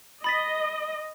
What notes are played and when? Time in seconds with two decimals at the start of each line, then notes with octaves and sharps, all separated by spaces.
0.24 D#5 B5 A6 B6